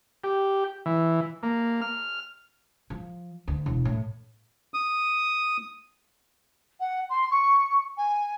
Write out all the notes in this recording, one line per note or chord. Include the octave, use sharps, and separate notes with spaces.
G4
E3
A#3
F6
F3
D2
E1
A2
D#6
F#5
C6
C#6
G#5